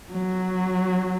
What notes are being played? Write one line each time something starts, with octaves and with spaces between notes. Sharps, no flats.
F#3